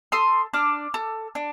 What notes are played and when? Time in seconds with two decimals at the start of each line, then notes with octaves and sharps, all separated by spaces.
0.12 A4 C6 D#6
0.53 D4 D6 F6
0.94 A4
1.35 D4